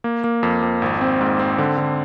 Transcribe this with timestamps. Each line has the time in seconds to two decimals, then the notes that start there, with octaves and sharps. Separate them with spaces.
0.04 A#3
0.24 A#3
0.43 F2
0.62 F2
0.82 G#1
1.01 C4
1.20 G#2
1.39 C4
1.58 D3
1.78 D3